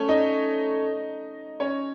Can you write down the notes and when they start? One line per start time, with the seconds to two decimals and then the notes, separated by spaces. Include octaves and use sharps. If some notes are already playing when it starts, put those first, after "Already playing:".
Already playing: A3 C#4 C#5
0.09 D#4 D#5
1.60 C#4 C#5